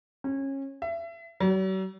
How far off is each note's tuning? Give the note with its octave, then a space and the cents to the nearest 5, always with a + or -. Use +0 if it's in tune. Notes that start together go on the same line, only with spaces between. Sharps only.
C#4 -25
E5 +30
F#3 +45